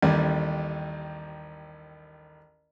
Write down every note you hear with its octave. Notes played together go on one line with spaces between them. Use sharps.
A1 D#2 G3